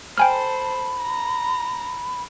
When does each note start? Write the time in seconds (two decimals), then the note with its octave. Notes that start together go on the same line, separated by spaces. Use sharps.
0.18 A4 C5 G5 G#5 B5 F6
1.03 A#5